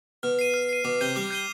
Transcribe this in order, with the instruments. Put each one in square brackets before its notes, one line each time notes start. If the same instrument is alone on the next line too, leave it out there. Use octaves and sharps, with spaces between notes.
[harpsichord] B2 [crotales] F6
[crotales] C7 D#7
F6
C7 D#7
[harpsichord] B2 [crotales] D6
[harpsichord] C3 [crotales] G6 C7 D#7 G7
[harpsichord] G3 [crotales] D6
[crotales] G6 C7 D#7 G7